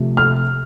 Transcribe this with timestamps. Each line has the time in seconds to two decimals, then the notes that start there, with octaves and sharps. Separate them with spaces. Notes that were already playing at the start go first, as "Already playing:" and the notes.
Already playing: C3 F3 A3
0.17 F6